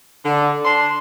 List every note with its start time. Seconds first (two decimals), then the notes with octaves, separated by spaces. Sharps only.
0.24 D3
0.64 D4 C6